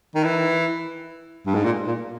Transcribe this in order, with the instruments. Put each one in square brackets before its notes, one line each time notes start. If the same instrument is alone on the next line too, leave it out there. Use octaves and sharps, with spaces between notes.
[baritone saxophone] D#3
E3
G2
G#2
A#2
A#2